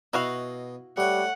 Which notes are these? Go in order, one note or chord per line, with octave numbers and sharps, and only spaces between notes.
B2 E4 F#4 D#5 F5
G3 A3 C#5 F#5